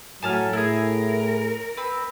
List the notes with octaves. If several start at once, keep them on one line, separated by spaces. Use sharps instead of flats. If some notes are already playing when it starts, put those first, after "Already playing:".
A2 F#3 A3 G#5 A5 F6
A2 E4 G#4 A#4
C4 B4